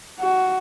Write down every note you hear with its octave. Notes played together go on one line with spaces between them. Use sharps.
F#4